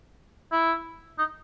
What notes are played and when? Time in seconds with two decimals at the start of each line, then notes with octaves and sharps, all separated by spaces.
0.52 E4
1.18 D#4